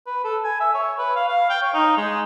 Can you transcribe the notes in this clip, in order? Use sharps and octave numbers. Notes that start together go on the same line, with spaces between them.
B4
A4
G#5
E5
C#5
B4
F5
F5
G5
C#5
D#4
G#3